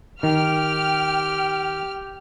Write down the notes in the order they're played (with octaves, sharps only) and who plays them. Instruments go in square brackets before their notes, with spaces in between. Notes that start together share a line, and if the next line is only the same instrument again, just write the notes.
[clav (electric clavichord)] D#3 [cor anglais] G4 [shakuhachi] G5 [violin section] F6